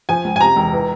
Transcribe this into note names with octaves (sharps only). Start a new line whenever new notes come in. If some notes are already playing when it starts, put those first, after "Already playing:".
F3 G#5
C#2
G#5
C3 A#5
E1
E3